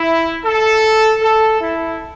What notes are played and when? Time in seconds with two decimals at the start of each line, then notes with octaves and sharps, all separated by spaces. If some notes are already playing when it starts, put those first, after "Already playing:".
Already playing: E4
0.45 A4
1.22 A4
1.61 E4